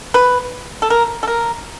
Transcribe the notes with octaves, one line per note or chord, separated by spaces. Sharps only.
B4
A4
A#4
A4
A#4